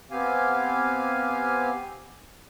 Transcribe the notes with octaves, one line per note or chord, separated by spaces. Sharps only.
B3 C4 G4 F5 G#5